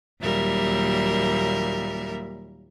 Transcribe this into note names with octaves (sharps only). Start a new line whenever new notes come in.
D#2 A#2 F#3 G3 A#4 E5